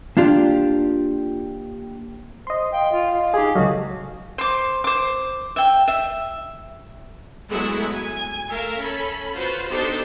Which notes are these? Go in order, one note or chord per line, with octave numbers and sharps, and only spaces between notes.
A#3 D4 F4 G4
C5 D#5 C6
F5 G5
F4 F5
D#4 G4 G#4
C#2 F#3 F#4 A4 D#5 F5
C5 D6
C5 D6
E5 G5
E5
F#3 G#3 A3 B3 E4 F#4
G#5
A3 A#4 E5 F5
C#4 A4 B5
F4 F#4 B4 C5
B3 D4 D#4 G4 A4 C5